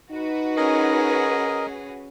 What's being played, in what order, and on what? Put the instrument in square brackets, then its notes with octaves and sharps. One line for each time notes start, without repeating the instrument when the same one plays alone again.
[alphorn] D#4 [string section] F#4 B4
[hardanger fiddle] C#4 G#4 [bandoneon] A#4 D#5